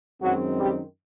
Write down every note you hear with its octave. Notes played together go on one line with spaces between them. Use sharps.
F#2 D#3 F#3 G#3 C4 F#4
G3 G4